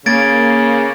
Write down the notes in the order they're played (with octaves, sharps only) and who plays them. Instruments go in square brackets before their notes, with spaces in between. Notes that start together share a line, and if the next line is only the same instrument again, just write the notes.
[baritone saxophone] C#3 [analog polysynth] A#3 [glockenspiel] G#6 A6 D7